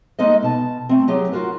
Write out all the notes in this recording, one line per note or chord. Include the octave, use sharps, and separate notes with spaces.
G#3 A#3 D#4 A4 D#5
B2 A5
A3 C4
F#3 A3 G4 G#4
F4 F#4 A#4 F#5